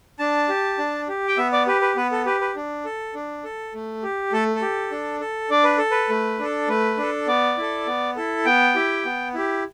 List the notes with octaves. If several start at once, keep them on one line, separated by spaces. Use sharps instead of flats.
D4 A5
G4
D4
G4
G5
B3 E5
D5
G4 B4
B4
B3 B4
A4
G4 B4
B4
D4
A4
D4
A4
A3
G4
A3 A4
A4
G4
D4
A4
D4 D5
B4
A4
B4
A3
D4 A4
A3 B4
D4 A4
B3 D5
E4 A4
B3
E4 A4
B3 G5
E4 G4
B3
E4 G4